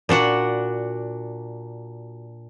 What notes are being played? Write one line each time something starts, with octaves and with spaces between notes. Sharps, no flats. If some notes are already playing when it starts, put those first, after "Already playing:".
A#2 D4 F#4 F#5